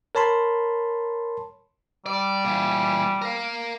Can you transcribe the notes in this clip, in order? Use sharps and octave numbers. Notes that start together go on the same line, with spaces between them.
A#4 C#5 A5 B5 C6
G3 D5
A#2 E3
A#4 F5